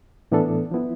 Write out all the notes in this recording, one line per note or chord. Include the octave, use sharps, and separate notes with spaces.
A2 E3 B3 D4 A4
F3 B3 E4